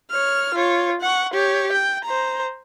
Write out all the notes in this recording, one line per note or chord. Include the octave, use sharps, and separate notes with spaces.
C#5 F6
F4 C#5
F#5 C#6
G4 C#5
G5
C5 A#5